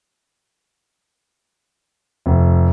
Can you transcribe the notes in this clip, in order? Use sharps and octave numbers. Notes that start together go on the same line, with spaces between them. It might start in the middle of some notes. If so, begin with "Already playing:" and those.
F1